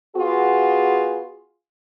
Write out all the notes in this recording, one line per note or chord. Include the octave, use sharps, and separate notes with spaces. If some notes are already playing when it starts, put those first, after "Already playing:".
B3 F4 F#4 G#4